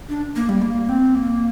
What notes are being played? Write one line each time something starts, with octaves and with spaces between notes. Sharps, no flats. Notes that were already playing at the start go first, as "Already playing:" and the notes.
D4
A#3
G3
A#3
C4
A#3